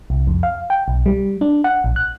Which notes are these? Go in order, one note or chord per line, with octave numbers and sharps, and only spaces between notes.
C2
F2
F5
G5
B1
G3
D4
F#5
A#1
F#6